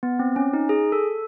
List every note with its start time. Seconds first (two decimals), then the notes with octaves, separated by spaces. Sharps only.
0.03 B3
0.19 C4
0.36 C#4
0.53 D#4
0.69 G#4
0.92 A4